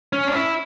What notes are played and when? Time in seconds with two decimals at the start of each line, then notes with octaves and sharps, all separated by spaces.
0.13 C#4
0.27 D4
0.33 E4